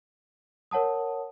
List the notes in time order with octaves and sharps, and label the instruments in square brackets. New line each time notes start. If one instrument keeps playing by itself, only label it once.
[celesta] A#4 C#5 F#5 A5 D#6